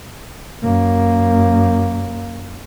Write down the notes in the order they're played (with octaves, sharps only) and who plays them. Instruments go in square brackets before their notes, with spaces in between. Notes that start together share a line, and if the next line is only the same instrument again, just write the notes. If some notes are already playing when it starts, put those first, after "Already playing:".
[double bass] F#2 A#3